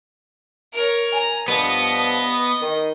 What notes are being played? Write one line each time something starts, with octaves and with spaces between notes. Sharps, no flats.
A#4 C#5
G#5 A#5
G2 F3 B3 D#5
D#3